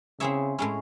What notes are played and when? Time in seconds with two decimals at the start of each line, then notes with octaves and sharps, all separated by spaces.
0.20 C#3 C4 E4 G#4 C#5 E5
0.59 A2 G#3 C#4 E4